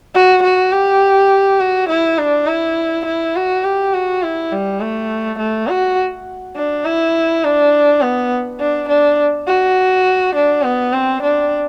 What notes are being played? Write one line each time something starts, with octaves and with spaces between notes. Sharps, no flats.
F#4
F#4
G4
F#4
E4
D4
E4
E4
F#4
G4
F#4
E4
G3
A3
A3
F#4
D4
E4
D4
B3
D4
D4
F#4
D4
B3
C4
D4